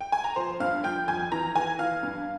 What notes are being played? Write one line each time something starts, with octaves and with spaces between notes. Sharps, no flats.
G5
G#5
A#5
F3 C5 C6
G2 F5 F6
F3 G5 G6
F2 G#5 G#6
E3 A#5 A#6
E3 G#5 G#6
E3 F5 F6
G2